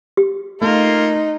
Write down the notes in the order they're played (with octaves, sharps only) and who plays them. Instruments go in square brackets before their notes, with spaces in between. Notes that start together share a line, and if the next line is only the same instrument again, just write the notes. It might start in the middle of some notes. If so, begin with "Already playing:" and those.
[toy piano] G4
[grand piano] A3 [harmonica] A#3 F4 [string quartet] D#4